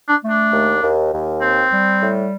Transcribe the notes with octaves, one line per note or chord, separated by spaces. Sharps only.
D4
A3
D4
D#2
D#2
D#2
C4
G3
A2